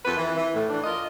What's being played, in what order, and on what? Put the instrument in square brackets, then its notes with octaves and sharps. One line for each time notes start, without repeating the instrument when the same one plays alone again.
[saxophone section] F2 B4
E3
E3
A2
E3 D4
F4 A#4 D#5